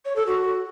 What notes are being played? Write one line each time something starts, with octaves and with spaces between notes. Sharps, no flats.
C#5
A4
F#4